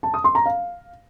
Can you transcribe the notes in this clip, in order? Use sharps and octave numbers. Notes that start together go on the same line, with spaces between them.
A5
D#6
C6
A#5
F5